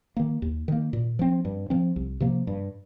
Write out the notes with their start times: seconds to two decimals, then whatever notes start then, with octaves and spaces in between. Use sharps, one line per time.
0.17 D#3 A#3
0.42 D#2
0.68 D#3 A#3
0.93 A#2
1.19 F3 C4
1.45 G2
1.70 F3 C4
1.96 C2
2.20 C3 F3 A#3
2.47 G2